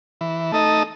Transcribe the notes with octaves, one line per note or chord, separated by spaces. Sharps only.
E3
A3 D#4 A4 D#5